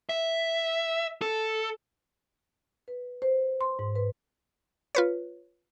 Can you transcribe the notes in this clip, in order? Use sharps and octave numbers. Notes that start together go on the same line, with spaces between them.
E5
A4
B4
C5
C6
G#2
B4
F4 B4 C#5